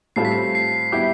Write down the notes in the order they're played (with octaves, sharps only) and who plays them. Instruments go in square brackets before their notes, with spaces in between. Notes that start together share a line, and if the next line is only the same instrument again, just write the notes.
[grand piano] A2 G3 C4 F4 A4 [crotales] C7
[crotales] B6
C7
C7
[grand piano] G3 B3 E4 G4